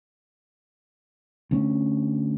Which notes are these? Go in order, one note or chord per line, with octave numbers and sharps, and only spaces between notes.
D2 A#3 C#4